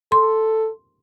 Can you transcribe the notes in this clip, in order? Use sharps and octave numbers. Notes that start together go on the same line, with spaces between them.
A4 C6